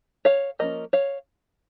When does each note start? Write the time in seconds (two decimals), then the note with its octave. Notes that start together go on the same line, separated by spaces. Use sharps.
0.25 C#5 F5
0.59 F3 A#3 C#4 A#4 D#5
0.93 C#5 F5